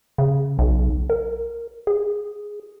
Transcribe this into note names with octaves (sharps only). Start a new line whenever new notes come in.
C#3
B1
A#4
G#4